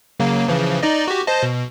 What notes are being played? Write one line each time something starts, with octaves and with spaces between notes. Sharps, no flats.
C#3 F#3 A#3
C#3 E3 F3
D#4 D5 D#5
F#4 G4
C5 D#5 A5
B2